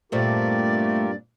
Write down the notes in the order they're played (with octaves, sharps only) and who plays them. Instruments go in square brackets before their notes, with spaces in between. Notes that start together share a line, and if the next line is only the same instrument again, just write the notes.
[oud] G2 A#2 C4 [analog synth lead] A3 [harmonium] F4 G4 A#4 [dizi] D5